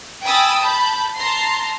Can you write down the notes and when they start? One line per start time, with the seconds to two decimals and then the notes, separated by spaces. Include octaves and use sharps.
0.23 G5 G#5 B5 D#6 E6 A6
0.59 A5 B5 G6
1.17 A5 A#5 C6 C7